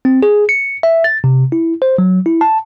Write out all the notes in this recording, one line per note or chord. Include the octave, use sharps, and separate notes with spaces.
C4
G#4
C#7
E5
A6
C3
E4
C5
F#3
E4
A5